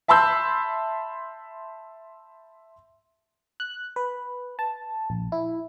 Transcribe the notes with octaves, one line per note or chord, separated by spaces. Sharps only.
E5 A5 B5 C6 E6 G6
F#6
B4
A5
A#1
E4